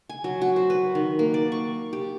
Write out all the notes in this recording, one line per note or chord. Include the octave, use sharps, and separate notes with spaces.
G#5
F#3
F#4
C5
B4
D#3
A#3
D5
C#6
G4